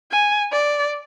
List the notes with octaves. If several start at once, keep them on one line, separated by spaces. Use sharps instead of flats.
G#5
D5